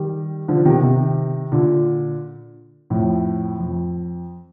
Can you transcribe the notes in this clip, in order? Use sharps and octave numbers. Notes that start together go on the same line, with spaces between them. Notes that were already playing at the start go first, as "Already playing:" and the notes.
Already playing: D#3 G3
D3 F3
C3 D#3
C3 D#3
A#2 D3
F2 A2
F2